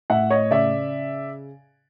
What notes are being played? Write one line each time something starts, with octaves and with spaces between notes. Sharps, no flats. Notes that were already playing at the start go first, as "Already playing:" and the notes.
A2 E5 F#5
C#5 D#5
C#3 D5 E5